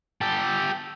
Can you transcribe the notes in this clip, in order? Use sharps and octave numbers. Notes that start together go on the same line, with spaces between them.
G4 A4